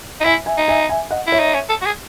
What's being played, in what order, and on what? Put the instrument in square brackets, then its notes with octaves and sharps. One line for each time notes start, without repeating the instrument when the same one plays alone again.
[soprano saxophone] D#4
[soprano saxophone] E4 [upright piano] E5 G#5
[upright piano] E5 G#5
[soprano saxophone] D#4
[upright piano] E5 G#5
E5 G#5
D#5 F#5
[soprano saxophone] E4
[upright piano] C#5 E5
[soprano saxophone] D#4
C#4
A4
F#4
G#4